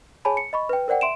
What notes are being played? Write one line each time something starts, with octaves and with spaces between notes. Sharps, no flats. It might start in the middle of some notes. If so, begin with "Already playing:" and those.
G#4 C#5 G#5 A5 B5
C#7
D#5 B5 C#6
B4 G5
A#4 C5 D5 F#5 G5
E5 C6 D7 E7